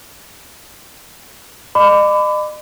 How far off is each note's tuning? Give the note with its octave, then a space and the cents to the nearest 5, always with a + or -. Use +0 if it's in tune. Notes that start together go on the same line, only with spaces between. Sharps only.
D#5 -40 B5 +35 D6 +0